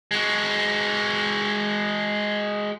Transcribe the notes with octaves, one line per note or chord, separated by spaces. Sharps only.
G#3 F#4